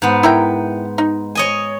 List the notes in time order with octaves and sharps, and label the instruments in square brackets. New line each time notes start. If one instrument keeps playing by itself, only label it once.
[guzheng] G#2 B3
[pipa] E4 A#4 G5
D#4
[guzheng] C#5 D#5 G#5